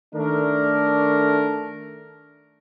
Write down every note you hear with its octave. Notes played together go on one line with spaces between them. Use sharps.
D#3 A3 D4 A#4